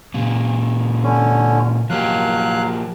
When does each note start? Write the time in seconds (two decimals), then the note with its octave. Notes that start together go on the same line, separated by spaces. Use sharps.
0.14 A#2 C#3
1.04 D3 C#4
1.90 F3 F#3 A#3 G4 F5 F#6